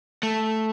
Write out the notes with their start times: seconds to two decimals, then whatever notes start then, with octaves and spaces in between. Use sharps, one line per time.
0.23 A3